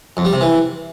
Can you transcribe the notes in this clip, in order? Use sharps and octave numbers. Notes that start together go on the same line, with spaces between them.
F2
G3
C3
E3